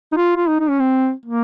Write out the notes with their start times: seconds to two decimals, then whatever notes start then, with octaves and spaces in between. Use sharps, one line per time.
0.12 D#4
0.17 F4
0.36 F4
0.48 D#4
0.60 D#4
0.70 C#4
0.80 C4
1.26 A#3